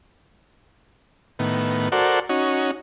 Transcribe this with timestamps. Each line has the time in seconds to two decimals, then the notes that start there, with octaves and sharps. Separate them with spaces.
1.39 A2 D#3 B3
1.92 F#4 A4 A#4 C5 D5 F#5
2.29 C#4 D#4 F#4